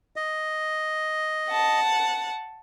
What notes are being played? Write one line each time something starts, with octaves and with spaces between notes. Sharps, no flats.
D#5
F#5 A5